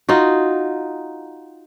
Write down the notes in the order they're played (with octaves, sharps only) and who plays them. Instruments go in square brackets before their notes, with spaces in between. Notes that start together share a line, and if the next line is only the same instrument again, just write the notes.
[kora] D#4 F4 F#4